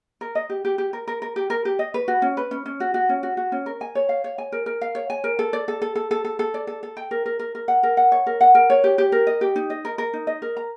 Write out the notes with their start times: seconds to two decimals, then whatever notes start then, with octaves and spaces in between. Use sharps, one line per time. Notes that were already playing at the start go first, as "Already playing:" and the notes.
0.21 A#4
0.35 D#5
0.50 G4
0.65 G4
0.78 G4
0.93 A#4
1.07 A#4
1.22 A#4
1.36 G4
1.50 A#4
1.65 G4
1.79 D#5
1.94 B4
2.08 F#4
2.22 C#4
2.37 B4
2.51 C#4
2.66 C#4
2.80 F#4
2.94 F#4
3.09 C#4
3.23 F#4
3.37 F#4
3.52 C#4
3.66 A#4
3.81 G#5
3.95 C#5
4.09 F5
4.24 C#5
4.38 G#5
4.52 A#4
4.66 A#4
4.81 F5
4.95 C#5
5.10 G#5
5.24 A#4
5.39 A4
5.53 D5
5.68 A4
5.82 A4
5.95 A4
6.11 A4
6.25 A4
6.39 A4
6.54 D5
6.67 A4
6.83 A4
6.97 G5
7.11 A#4
7.26 A#4
7.39 A#4
7.55 A#4
7.68 F#5
7.83 A#4
7.97 F#5
8.12 C#5
8.27 A#4
8.41 F#5
8.55 A#4
8.70 C#5
8.84 G4
8.98 G4
9.12 A#4
9.27 D#5
9.41 G4
9.56 D#4
9.70 D#5
9.85 A#4
9.98 A#4
10.14 D#4
10.27 D#5
10.42 A#4
10.57 A#5